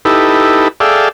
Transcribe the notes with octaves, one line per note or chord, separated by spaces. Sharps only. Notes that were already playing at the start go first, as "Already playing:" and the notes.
D#4 E4 G4 A4 B4
G#4 A4 D5 E5 F5 G5